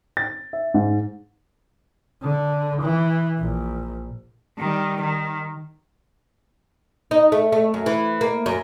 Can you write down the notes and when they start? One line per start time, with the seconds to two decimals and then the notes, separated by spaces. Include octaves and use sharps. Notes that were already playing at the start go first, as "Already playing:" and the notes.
0.17 A6
0.53 E5
0.74 G#2
2.22 D3
2.82 E3
3.39 A#1
4.58 D#3 G3
5.01 D#3
7.11 D#4
7.32 A3
7.52 A3
7.74 F#2
7.86 E3
8.21 A#3
8.46 F#2